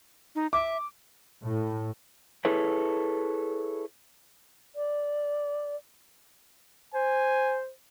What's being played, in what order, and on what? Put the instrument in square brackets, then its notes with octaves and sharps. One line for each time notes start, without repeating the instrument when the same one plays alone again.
[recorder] D#4
[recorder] E5 [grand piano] D6
[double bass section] A2
[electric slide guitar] E4 G#4 A4 B4 C#5
[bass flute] D5
[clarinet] C5 [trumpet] G#5